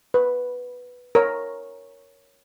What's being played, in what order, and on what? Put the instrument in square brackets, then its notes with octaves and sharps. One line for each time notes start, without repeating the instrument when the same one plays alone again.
[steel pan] B4
A#4 C#5